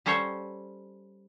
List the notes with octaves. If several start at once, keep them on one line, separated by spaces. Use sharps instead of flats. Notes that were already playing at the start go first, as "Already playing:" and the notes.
G3 C#4 A4 C5 C#5